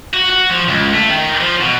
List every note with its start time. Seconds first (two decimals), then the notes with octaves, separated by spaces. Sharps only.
0.14 F#4
0.30 F#4
0.50 F3
0.68 C#2
0.93 A3
1.10 D#3
1.40 F3
1.60 B2